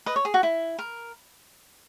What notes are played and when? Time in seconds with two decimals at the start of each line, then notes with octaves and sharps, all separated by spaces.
0.06 B4 D#5
0.16 C#5
0.25 G#4
0.34 F#4
0.43 E4
0.79 A#4